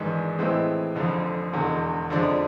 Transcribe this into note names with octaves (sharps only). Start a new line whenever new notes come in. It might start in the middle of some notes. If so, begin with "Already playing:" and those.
Already playing: G#1 G#2 E3 G#3 D4
A2 E3 G#3 C4 E4
F1 F2 D3 F3
E1 E2 D3 G#3
F2 D3 F3 G#3 D4